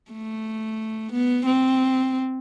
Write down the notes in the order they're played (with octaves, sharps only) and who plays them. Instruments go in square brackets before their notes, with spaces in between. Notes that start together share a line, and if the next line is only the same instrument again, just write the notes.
[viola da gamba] A3
B3
C4